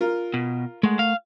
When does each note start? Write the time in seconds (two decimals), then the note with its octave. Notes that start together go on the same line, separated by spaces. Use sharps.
0.01 F4 A#4
0.34 B2
0.83 G#3 A3 A#4 F#5
0.99 F5